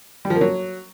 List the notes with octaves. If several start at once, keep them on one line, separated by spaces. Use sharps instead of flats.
G3
F3
A#3
F#3